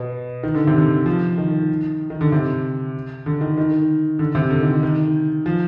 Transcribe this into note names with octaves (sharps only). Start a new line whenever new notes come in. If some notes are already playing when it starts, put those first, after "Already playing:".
Already playing: B2
D#3
D3
C3
D3
F3
D#3
D#3
D3
C3
D3
D#3
D#3
D3
C3
D3
D#3
D#3
D#3
F3